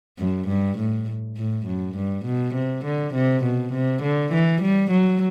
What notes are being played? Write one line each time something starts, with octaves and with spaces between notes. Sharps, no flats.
F#2
G2
A2
A2
F#2
G2
B2
C3
D3
C3
B2
C3
D3
E3
G3
F#3